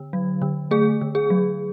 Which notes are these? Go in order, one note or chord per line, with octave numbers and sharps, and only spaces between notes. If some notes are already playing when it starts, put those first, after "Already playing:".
Already playing: D3
F#3
D3
A3 G#4
D3
G#4
F#3